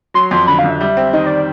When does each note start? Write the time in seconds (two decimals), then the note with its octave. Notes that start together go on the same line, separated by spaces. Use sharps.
0.14 F#3 C6
0.31 F2
0.47 D3 B5
0.59 F5
0.64 F2
0.70 E5
0.81 G3
0.97 C4
1.13 D#3 D#5
1.27 D5